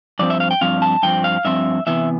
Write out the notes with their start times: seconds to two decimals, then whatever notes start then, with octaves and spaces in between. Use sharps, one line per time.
0.19 G2 F3 C4 D5
0.30 E5
0.40 F5
0.51 G5
0.61 G2 F3 C4 F5
0.82 A5
1.03 G2 F3 C4 G5
1.24 F5
1.45 G2 F3 C4 E5
1.87 C3 E3 B3 E5